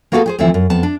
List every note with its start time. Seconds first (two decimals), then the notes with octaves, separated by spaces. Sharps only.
0.12 A#3 B3 F#4 G#4 A4 F5
0.26 G4 G#4 C5
0.39 D2 E3 F3 C4 E5
0.54 F#2
0.70 F2 B3 A5
0.83 D4